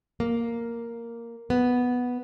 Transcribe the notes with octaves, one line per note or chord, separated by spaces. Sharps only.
A#3
B3